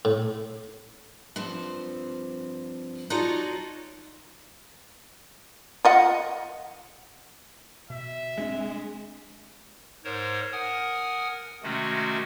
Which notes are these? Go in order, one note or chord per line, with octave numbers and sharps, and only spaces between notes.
A2
G2 F3 C4
D#4 F4 F#4 A4 C#5 D5
F4 D#5 F#5
B2 E5
F#1 G#3 C4 D4
G#2 A#4 C5 C#5
A#4 F#5 G#5 D#6
C3 D#3 G#3 A3 C#4 F#4